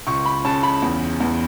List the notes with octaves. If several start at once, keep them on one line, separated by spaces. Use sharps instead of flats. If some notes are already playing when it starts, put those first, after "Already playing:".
C#2 C#6
B5
C#3 A5
B5
E2
E2